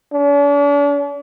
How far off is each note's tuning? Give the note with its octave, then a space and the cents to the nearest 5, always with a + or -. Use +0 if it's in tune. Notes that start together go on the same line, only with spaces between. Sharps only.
D4 -45